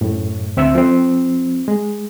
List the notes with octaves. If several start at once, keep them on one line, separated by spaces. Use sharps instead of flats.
F#2 A2
D2 C4 E5 E6
F3 C4
G#3